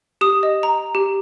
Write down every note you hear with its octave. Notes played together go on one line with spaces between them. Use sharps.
G4 D#6
D#5
A#5
G4